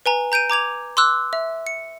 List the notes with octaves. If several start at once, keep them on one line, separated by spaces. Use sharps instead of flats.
B4 G#5 A#5
A#5 G6 D7 D#7
A#5 D6 G#6 F7
C6 D6 E6 F#6
E5
C#7